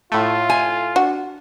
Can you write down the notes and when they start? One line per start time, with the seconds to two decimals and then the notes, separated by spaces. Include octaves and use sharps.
0.12 A2 A3 F4
0.50 G#5
0.96 D4 F#4